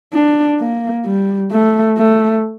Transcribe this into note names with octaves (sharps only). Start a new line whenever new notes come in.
D4
A#3
G3
A3
A3